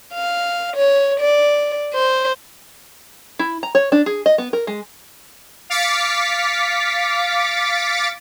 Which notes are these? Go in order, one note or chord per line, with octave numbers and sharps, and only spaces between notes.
F5
C#5
D5
C5
E4
A#5
C#5
D4
G#4
D#5
B3
A#4
G#3
F5 D6 A6 B6 C#7